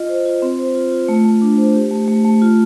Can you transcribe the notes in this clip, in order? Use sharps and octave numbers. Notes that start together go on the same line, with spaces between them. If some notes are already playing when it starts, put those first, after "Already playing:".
Already playing: F4 D#5
C5
F4
C4
C5
F4
F4
A3
A3
D4
C5
G4
A3
A3
A3
F4